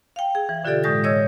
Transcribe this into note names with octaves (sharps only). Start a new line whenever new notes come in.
F5 G5
G#4
E3
B2 D3 F4 G4 A4 D5
A2 G#3 D#6 G6 A#6
C#5 D#5 E6 G#6 A#6